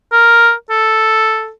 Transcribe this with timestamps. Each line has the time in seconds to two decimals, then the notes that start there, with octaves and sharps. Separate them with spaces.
0.12 A#4
0.70 A4